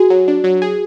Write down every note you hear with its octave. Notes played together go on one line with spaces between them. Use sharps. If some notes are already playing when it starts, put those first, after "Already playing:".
Already playing: F#4 G#4
F#3
D4
F#3
G#4